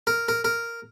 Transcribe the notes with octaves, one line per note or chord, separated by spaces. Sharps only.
A#4
A#4
A#4